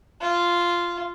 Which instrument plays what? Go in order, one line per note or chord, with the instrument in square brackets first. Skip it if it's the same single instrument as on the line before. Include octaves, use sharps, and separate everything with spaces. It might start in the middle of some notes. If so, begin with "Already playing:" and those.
[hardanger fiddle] F4